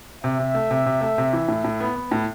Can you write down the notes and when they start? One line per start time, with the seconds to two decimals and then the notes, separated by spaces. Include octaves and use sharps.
0.23 C3 E5
0.39 C3
0.55 A3
0.71 C3
0.86 C3
1.01 A3
1.18 C3
1.33 E3
1.48 A2
1.64 A2
1.80 B3
1.96 B3
2.11 A2